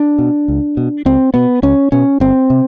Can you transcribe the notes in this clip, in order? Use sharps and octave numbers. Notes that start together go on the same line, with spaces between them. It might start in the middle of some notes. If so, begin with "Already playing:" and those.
Already playing: D4
B2
C#2
B2
C#2 C4
B2 B3
C#2 C#4
B2 C#4
G1 C4
C3